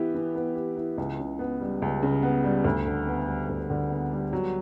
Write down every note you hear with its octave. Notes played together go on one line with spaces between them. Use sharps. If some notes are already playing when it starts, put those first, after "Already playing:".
Already playing: E3 B3 E4 G4
E3
B3
G4
E4
C#2
C#3
B3
G3
C#2
C#3
B3
G3
D2
D3
B3
G3
D2
D3
B3
G3
F#3